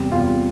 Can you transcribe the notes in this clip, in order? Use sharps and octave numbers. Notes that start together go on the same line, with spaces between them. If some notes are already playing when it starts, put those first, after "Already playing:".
Already playing: E2 C3 G3
E2 C3 G3 F4